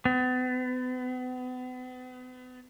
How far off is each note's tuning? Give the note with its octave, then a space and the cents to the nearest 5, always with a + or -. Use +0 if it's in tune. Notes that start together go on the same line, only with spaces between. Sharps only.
B3 +40